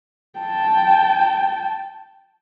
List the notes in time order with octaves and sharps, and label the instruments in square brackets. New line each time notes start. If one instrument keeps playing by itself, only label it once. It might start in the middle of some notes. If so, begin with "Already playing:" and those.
[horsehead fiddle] G5 A5